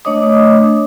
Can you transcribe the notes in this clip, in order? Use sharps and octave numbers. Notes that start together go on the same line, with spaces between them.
A3 D4 C#5 D#5 D6 D#6